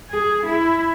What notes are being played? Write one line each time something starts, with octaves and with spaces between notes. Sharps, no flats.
G#4
E4